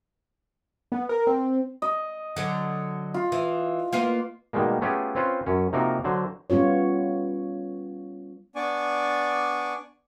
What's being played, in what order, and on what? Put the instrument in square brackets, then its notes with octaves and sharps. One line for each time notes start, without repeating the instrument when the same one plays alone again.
[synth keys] B3
A#4
C4
[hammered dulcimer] D#5
[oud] D3 F#3
[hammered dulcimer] F4
[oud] E3
A#3 B3 F4
[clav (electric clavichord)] B2 D#3 G3 G#3 A#3
A3 B3 C#4 F4 G4 G#4
C4 C#4 F4 B4 C5
F#2 C#4
C3 F3 A#3 D#4 F#4 A#4
D3 F#3 C5
[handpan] G3 B3 C#4 F4 C#5
[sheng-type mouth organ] B3 D4 D5 G#5 C#6 D6